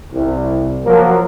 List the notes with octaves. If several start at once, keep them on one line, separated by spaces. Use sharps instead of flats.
C2
F3 F#3 A#3 F#4 A#4